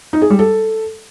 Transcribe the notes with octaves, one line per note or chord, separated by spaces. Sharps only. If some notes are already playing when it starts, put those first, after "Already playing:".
D#4
G#4
G3
A4